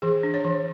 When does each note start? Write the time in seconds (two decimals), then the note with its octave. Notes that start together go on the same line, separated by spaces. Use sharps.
0.02 E3 G#4
0.23 D4
0.34 C#5
0.45 E3